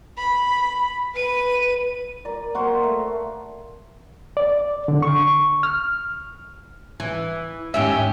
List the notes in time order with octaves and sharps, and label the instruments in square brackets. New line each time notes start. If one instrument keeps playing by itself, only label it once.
[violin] B5
B4 D#7
[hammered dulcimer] A#4 D5
A#3 F#4 C5
A3
[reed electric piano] D5
D3
C#6
F6
[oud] E3
[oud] D#2 G#2 E5 [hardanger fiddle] C#4 G4